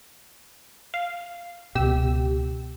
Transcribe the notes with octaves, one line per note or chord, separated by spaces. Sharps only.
F5
C#2 B2 G4 E6